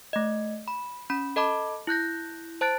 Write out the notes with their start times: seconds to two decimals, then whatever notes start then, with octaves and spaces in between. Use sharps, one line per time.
0.13 A3 D#5
0.68 B5
1.10 C#4 B5
1.36 A4 D#5 A5 B5 D6
1.87 E4 F#6 G6 A#6
2.61 C5 A5 F#6 A6 D7